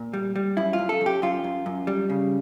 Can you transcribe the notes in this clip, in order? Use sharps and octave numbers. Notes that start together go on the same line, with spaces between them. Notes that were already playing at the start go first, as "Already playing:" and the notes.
Already playing: A#2
G3
G3
F#2 E4
F4
F#2
A4
F#2
G4
F#2 F4
F#2
F#2
G3
C#3